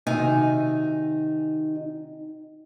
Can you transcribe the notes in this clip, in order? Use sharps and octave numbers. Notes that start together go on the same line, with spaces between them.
C3 D#3 D#4 F#4 G#5